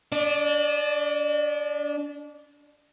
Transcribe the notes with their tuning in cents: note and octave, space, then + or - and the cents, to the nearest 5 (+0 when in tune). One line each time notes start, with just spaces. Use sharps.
D4 -30 D5 +35